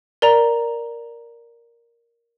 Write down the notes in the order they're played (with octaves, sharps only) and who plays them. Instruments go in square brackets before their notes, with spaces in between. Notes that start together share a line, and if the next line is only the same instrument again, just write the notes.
[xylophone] A#4 D5 A#5